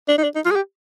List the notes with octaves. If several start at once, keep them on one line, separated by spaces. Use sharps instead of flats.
D4
D#4
D4
D#4
F4
G#4
G4